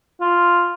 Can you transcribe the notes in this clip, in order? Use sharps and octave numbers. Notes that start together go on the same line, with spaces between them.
F4